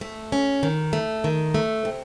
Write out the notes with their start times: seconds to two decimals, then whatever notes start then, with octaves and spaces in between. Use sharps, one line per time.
0.01 A3
0.32 C#4
0.63 D#3
0.93 A3
1.24 D#3
1.54 A3
1.85 C3